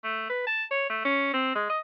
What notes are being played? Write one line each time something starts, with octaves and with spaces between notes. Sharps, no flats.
A3
B4
A5
C#5
A3
C#4
C4
G#3
D#5